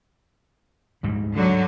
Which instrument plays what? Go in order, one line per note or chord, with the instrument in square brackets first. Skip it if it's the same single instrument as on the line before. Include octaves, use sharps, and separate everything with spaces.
[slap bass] D2 G#2 G3
[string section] D3 F#3